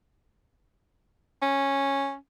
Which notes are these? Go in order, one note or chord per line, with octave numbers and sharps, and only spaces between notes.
C#4